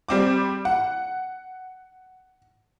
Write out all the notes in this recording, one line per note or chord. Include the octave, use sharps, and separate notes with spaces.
G3 C4 D6
F#5